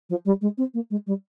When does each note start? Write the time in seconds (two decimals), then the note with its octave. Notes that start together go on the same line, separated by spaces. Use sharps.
0.09 F3
0.25 G3
0.41 G#3
0.57 C4
0.74 A#3
0.90 G#3
1.07 G3